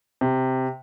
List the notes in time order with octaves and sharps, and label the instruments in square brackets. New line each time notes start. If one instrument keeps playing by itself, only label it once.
[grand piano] C3